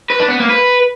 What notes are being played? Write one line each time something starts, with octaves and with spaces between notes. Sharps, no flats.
B4
D4
B3
A#3
B4